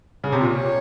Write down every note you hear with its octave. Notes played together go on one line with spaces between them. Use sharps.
C#3
C3
A#2 C#5